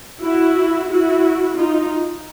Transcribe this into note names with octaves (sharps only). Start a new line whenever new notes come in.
E4 F#4
E4 F#4
D#4 F4